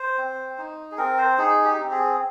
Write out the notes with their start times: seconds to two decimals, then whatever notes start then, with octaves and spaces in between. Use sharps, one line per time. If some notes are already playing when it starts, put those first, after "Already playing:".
Already playing: C5
0.18 C4
0.58 D#4
0.92 G#4
0.98 C4 A#4
1.18 C5
1.38 D#4 G#4
1.64 G4
1.78 C4
1.91 G#4